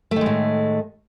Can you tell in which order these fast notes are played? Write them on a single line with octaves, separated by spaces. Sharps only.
A3 D#3 G#3 A2